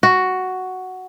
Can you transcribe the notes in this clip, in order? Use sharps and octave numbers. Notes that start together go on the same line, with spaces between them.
F#4